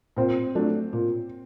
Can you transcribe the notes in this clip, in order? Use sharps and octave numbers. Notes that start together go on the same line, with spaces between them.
A#2 C4
F#3 A3 D4
A#2